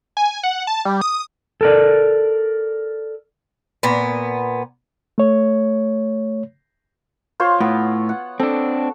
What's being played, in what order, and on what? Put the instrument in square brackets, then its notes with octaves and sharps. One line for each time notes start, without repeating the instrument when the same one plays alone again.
[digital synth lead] G#5
F#5
A5
G3
D#6
[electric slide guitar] A4 A#4 D5
[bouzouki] A#2 B3
[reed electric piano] A3 C#5
[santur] F4 C5 C#5
[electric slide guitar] A2 [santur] B3
[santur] F#5
[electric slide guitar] C4 D4 [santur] A4